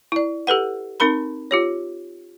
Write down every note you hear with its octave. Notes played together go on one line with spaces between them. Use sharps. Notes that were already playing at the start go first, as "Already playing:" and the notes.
E4 D5
G4 A4 B4 F#5
C4 D#4 A#4 A#5 B5
F4 G4 C#5